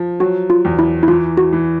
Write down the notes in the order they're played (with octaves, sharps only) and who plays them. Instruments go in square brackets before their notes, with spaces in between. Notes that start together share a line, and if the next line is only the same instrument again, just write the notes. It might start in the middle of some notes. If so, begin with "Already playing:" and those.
Already playing: [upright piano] F3
[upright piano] F#3 [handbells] F#4
[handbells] F4
[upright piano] E2
[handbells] E4
E4
[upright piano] E3 [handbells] F4
[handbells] F#4
[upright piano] E3